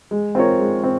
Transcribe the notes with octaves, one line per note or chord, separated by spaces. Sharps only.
G#3
C4 F4 A#4 C#5
G#3
C4